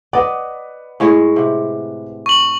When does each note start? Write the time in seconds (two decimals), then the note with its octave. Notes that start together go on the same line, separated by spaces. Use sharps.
0.13 B4 D5 D#5 F#5
1.00 A2 G#3 C#5
1.36 C3
2.26 C#6 F#7